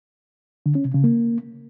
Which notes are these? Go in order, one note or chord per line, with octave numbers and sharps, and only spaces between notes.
D3
C#4
C3
C#3
A#3